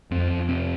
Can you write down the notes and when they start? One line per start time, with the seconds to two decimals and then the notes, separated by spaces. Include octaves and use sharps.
0.11 F2 C4
0.30 F2
0.49 C3 C4